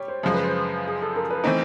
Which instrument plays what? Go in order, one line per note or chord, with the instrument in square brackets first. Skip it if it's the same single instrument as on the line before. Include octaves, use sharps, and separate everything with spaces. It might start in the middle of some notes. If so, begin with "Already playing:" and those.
Already playing: [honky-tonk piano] G3 G4 [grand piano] C#5
[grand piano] C5
[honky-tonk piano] F#2 C#3 F3 G#3 [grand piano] C5
[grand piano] B4
C5
G#4
A4
A#4
B4
[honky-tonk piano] E3 A3 C4 D#4 [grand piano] C5